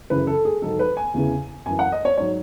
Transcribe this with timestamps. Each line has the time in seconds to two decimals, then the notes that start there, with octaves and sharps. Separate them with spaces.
0.10 F#2 C#3 E3 B4
0.27 A4
0.45 G#4
0.62 G#2 D#3 F#3 A4
0.79 B4
0.97 G#5
1.14 E2 C#3 E3
1.66 F#2 E3 G#5
1.79 F#5
1.92 D#5
2.05 C#5
2.17 G#2 F#3 C#5